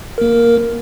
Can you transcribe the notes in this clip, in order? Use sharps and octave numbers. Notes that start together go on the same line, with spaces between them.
A#3 A#4